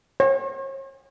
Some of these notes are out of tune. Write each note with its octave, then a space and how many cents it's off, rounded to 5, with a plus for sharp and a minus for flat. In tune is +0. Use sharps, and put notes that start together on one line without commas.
C#5 -40